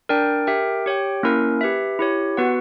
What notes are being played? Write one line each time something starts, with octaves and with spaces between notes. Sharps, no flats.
D4 A#4 D5 G5
G4 A#4 E5 G5
G4 C#5 G5
A#3 C#4 E4 A#4
G4 B4 E5
E4 G4 C#5
B3 F#4 B4 F#5